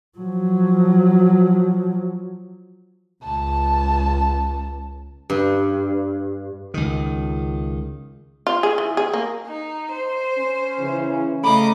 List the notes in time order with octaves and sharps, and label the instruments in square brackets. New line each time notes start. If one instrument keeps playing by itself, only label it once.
[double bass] F3 F#3
[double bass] C#2 [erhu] A5
[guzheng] G2
[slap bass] C#2 D#3
[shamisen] F4
G#4
E3
G#4
A#3
[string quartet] D#4
C5
[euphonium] C#4
[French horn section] C#3 E3
[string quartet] C#3 D#5 D6 [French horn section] A3 [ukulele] F5 A#5 B5